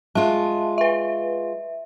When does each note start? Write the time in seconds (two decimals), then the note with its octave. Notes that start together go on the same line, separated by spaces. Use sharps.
0.15 G#3 F4 E5 A5
0.78 B4 E5